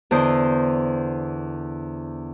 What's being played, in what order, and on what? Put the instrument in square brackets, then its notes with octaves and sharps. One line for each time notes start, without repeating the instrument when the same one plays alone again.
[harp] E2 D3 C5 D#6